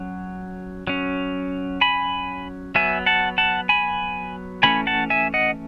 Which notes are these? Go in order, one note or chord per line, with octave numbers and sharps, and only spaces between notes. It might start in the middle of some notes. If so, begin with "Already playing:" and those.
Already playing: F#3 C#4
F#3 C#4
G#5 B5
F#3 B3 E5 G#5
F#5 A5
F#5 A5
G#5 B5
E3 A3 C#4 G#5 B5
F#5 A5
E5 G#5
D#5 F#5